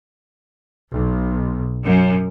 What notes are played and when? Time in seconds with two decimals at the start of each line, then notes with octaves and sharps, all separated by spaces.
0.92 B1
1.84 F#2